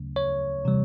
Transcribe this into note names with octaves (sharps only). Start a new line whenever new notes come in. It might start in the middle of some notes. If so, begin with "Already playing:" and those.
Already playing: D2 C#3 F#3 A3 C#4
C#5
C3 E3 G3